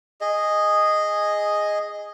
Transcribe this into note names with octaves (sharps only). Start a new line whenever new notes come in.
G#4 D#5